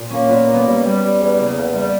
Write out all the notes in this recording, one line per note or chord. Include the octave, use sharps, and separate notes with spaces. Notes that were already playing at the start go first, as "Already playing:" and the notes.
Already playing: A#2
A#3 C#4
A#2 B3
A#3
B3
G3
G3
G3
E2
C#3 A#3
E2
G3